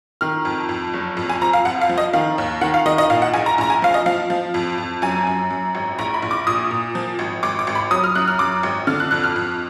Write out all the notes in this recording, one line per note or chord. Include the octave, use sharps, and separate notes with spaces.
D#3 F6
F2
F2
F#1
F2
G#5
F3 A#5
F5
F2 F#5
F5
F3
D#5
D#3 F5
D#2
D#3 F#5
F5
D#3 D#5
D#5
A#2 F5
F#5
A#1 G#5
A#5
A#1 A#5
G#5
F3 F5
D#5
F3 F5
F3
F2
F2
F#2 G#5
F#2
F#2
G#1
A#1 A#5
B5
A#1
D6
A#2 D#6
A#2
F3
G#1
G#1 D6
D6
G#1
B5
F#3 D#6
F6
F#2 F#6
F6
F#2 D6
G#1
D3 F6
F#6
F2 F#6
F6
F2